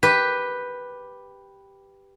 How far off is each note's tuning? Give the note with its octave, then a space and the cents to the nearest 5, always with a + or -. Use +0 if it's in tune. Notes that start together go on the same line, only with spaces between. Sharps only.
G4 +0 B4 +0